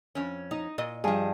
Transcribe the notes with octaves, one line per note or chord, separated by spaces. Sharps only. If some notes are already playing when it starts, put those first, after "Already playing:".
F2 C#4
D#4
A#2 D#5
G2 F3 G#4